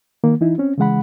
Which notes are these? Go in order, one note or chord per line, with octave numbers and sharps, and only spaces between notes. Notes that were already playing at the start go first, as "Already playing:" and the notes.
D#3 A#3
E3 D#4 E4
C4 C#4
C#3 E3 G#3 F#5 B5